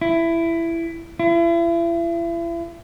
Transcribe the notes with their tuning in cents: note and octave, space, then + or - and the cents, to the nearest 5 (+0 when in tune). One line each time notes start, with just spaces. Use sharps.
E4 +15
E4 +40